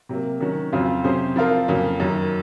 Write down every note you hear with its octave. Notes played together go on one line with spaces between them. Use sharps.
C3 F#3 A#3
D#3 F#3 C#4 F#4
F2 C#3 F#3 C4 F4
C3 F#3 C#4 G#4 C5
F3 C4 F4 A#4
F2 C#3 F#3 A#3
F#2 D#3 F#3